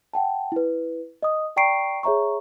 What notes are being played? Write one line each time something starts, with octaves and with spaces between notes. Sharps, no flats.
F#5 G5 A5
E4 B4
D#5 D#6
D5 G5 A#5 C#6 C7 D7
G#4 C#5 E5 A#5 C#6